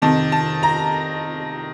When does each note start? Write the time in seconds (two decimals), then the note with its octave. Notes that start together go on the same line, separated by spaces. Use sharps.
0.02 F2 C3 D#3 A5
0.32 A5
0.63 A#5